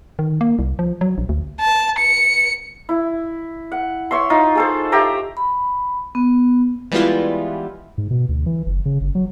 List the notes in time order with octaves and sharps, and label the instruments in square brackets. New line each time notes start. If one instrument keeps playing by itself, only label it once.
[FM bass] D#3
A#3
C2
F3
F#3
A#1
D2
[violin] A5
C#7
[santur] E4
F#5
C#5 E5 C6
D#4 F4
G#4 A4 C5
G4 E5 G5 A#5
[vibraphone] B5
B3
[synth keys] E3 G3 G#3 B3 E4 F4
[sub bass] G#2
B2
D2
E3
F#1
C#3
G1
F#3